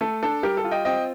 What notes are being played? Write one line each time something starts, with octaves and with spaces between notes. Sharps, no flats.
A3 A4
D4 A4
G3 G4 A#4
A4
F4
D#5 G5
C4 D#5 G5